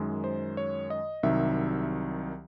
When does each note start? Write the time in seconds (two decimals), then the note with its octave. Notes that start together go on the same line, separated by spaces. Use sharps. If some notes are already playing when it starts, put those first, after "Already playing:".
Already playing: F#2 D#3 G#3
0.24 C5
0.57 C#5
0.90 D#5
1.23 C2 C3 D#3 F#3 E5